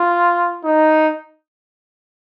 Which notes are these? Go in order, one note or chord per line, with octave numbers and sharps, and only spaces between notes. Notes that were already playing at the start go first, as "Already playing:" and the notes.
Already playing: F4
D#4